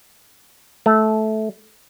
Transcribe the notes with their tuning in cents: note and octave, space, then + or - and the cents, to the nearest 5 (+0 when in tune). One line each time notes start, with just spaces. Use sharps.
A3 -15